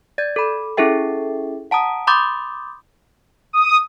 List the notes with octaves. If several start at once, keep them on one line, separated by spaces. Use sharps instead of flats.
D5 G#6 A6
A4 B5
C#4 E4 G#4 A4 E5 G5
F#5 A5 A#5 D#6
B5 C6 D6 D#6 G6 A6
D#6